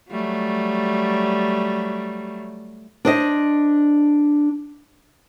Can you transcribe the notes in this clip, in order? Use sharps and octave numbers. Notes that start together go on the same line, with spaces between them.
F#3 G3 A3
D4 C5 D#5